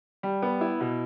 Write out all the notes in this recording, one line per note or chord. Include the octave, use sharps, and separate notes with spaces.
G3
B3
E4
B2